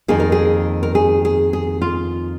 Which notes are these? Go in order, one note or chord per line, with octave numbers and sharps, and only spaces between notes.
F2 D#3 A#3 G#4
A#4
G#4
A#4
G#4
G#4
G#4
F4